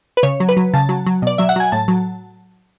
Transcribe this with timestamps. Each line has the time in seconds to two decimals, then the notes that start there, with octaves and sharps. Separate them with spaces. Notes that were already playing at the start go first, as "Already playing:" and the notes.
0.17 B4
0.23 C#3 C#5
0.40 F#3
0.49 B4
0.57 F#3
0.74 C#3 A5
0.89 F#3
1.06 F#3
1.22 B2 D5
1.38 F#3 E5
1.49 F#5
1.56 F#3 G#5
1.72 A2 A5
1.88 F#3